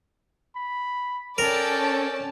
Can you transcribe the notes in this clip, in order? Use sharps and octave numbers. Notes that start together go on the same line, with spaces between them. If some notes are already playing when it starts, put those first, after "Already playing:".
B5
C#4 A4 A#4 D5 G5 A5